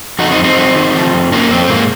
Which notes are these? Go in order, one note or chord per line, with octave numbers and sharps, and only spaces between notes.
F2 D#4 F#4
C4 D#4
F2
C4 D#4
F#3
D#3
F3
F2
F2 A#3 C#4
F2 C4
G#2 A#3